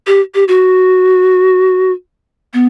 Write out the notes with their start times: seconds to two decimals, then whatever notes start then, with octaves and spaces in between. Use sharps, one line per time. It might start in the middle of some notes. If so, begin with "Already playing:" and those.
0.07 G4
0.34 G4
0.48 F#4
2.53 B3